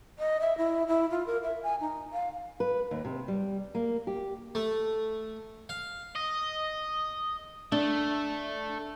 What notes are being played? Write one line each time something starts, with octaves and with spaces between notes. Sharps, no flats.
D#5
E5
E4
E4
F4
A#4
E5
G#5
D#4
F5
B4
D#2
C3
G3
A#3
G4
A3
F5
D#5
A3 D4